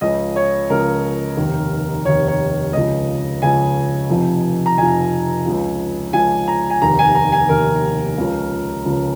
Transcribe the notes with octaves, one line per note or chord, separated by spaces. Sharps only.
C#2 C#3 F3 D#5
C#5
C#2 C#3 F3 A#4
F1 D#2 D#3
F1 D#2 D#3 C#5
C#5
C#2 C#3 F3 D#5
C#2 C#3 F3 G#5
F1 F2 F3
A#5
F1 F2 F3 G#5
C#2 C#3 F3
C#2 C#3 F3 G#5
A#5
G#5
F1 D#2 D#3 A#5
G#5
A#5
G#5
F1 D#2 D#3 A#4
C#2 C#3 F3
C#2 C#3 F3